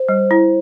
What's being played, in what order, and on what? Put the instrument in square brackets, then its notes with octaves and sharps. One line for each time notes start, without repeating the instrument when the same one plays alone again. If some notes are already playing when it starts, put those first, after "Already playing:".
Already playing: [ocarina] C5
[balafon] G3
E4